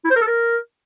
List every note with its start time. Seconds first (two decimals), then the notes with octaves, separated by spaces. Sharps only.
0.05 E4
0.10 C5
0.16 A#4
0.22 A4
0.27 A#4